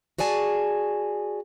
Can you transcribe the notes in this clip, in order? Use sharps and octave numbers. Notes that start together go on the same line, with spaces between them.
F#4 G#4 D5 G#5 A5